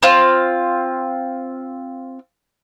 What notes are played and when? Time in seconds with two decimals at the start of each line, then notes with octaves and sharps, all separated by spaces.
0.03 C4 F4